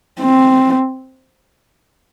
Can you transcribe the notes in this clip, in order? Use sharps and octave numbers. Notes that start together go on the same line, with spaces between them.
C4